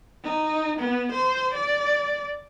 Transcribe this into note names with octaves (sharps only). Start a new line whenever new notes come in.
D#4
B3
C5
D5